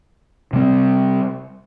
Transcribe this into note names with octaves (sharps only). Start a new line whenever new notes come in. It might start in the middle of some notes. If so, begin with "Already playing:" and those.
C3 G3 C4